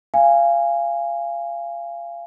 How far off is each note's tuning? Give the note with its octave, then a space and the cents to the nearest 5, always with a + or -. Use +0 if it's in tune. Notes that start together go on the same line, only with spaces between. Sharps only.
F5 -25 G#5 -15